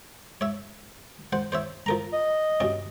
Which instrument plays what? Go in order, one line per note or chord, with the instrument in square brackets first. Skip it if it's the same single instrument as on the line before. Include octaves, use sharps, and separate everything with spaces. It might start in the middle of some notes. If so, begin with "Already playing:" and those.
[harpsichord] C#5 E5
C5 F#5
C5 C#5 E5
F3 A#4 A#5
[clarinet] D#5
[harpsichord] G2 B2 C#4